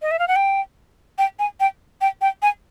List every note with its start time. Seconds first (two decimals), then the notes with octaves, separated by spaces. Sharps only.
0.02 D#5
0.11 E5
0.19 F5
0.28 F#5
0.36 G5
1.18 G5
1.39 G#5
1.60 G5
2.01 G5
2.21 G5
2.42 G#5